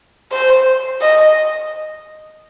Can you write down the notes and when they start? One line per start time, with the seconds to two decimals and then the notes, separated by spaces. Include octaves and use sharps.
0.32 C5
1.02 D#5